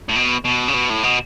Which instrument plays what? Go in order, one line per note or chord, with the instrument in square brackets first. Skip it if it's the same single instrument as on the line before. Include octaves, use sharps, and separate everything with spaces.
[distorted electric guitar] A2
B2
B2
C#3
B2
A2
B2